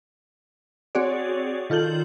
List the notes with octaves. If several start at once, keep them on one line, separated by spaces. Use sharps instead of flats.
C4 F#4 G#4 C#5 D5
D#3 F4 A4 G6 F#7